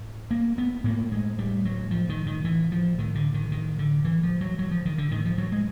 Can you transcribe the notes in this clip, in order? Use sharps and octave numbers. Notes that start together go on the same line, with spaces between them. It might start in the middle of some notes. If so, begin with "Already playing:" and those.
Already playing: A2
A#3
B3
A2 A#3
G#3
G3
F#3
F3
D#3
D#3
E3
F3
A2 D#3
D3
D#3
D#3
D3
E3
F3
F#3
F#3
F3
D#3
D3
A2 D#3
F3
F#3
G#3